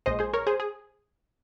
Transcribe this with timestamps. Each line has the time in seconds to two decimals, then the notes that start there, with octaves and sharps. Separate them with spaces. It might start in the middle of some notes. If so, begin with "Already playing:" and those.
0.06 A#1 A#2 G#3 C5 D#5
0.19 G#4 C5
0.33 A#4 C#5
0.47 G#4 C5
0.60 G#4